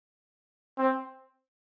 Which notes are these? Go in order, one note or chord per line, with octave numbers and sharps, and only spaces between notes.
C4